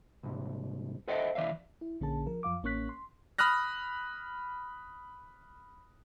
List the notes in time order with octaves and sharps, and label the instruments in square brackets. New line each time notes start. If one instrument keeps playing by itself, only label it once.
[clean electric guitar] C2 G#2
A4 C5 D#5 E5 F#5 G5
E3 D5 E5 F5
[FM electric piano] E4
A#1 D3 A#3 C#4 G#4 A5
F3 A#4
F#2 F3 F5 D6
A1 A#3 C#4 C#6 F#6 B6
C6
[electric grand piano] B5 D#6 F6 F#6 A#6